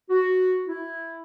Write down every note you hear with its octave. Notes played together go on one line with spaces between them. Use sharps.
F#4
E4